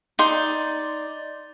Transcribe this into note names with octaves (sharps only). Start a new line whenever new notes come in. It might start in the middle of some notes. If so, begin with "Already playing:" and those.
D#4 D5 C6